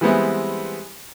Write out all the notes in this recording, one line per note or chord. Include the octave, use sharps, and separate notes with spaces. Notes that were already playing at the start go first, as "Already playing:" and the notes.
E3 G3 G#3 B3 C4 E4